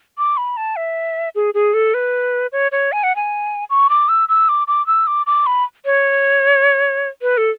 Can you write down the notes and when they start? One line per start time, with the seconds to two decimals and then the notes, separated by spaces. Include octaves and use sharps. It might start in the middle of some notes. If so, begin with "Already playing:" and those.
0.18 D6
0.37 B5
0.57 A5
0.76 E5
1.35 G#4
1.54 G#4
1.74 A4
1.94 B4
2.52 C#5
2.72 C#5
2.92 G#5
3.03 F#5
3.16 G#5
3.70 C#6
3.90 D6
4.09 E6
4.29 E6
4.49 D6
4.68 D6
4.87 E6
5.07 D6
5.26 D6
5.46 B5
5.85 C#5
7.22 B4
7.37 A4